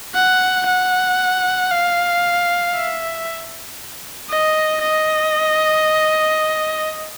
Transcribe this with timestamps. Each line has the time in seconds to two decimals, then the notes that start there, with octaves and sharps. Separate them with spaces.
0.15 F#5
0.66 F#5
1.71 F5
2.75 E5
4.30 D#5
4.82 D#5